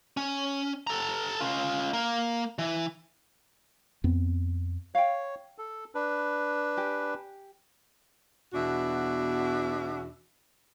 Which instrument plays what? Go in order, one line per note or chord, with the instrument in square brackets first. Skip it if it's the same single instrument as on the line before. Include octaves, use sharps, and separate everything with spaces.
[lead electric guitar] C#4
A4 A#5
C#4 F4
A#3 A#4
E3
[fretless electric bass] F2 B3 C4
[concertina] C#5 [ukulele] F5 G5
[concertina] A4
D4 B4
[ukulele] G4 G#5
[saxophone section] E2 B2 D4 F#4 E5